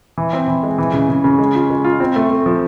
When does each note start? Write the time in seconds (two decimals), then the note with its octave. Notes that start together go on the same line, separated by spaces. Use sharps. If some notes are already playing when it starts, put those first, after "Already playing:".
0.18 E3
0.33 C4
0.48 E3
0.63 G#3
0.78 E3
0.94 C#3
1.09 C#3
1.24 C#3
1.39 G#3
1.55 F4
1.70 G#3
1.84 F4
2.00 C4
2.16 A3
2.30 A3
2.46 F3